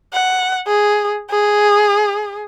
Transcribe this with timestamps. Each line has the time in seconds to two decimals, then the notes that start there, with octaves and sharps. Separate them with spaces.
0.13 F#5
0.67 G#4
1.30 G#4